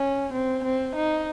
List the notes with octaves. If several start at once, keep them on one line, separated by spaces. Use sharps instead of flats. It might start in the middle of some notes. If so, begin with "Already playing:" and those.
Already playing: C#4
C4
C4
D#4